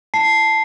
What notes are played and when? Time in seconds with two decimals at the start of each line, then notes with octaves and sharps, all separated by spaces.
0.14 A5 C7